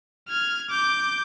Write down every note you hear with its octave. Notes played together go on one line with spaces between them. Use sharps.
F6 G#6
D6 G6